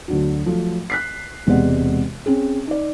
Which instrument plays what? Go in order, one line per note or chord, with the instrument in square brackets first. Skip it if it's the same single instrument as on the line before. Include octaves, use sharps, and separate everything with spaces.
[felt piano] D2 D3 F#3
F3 F#3 A3
F#6 B6 C7
E1 C3 G#3 B3 D5 F#5
C4 C#4 G#4
D#4 D5